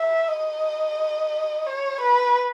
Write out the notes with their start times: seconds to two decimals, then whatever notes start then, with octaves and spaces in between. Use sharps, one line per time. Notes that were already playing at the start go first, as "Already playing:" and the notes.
Already playing: E5
0.28 D#5
1.67 C#5
2.01 B4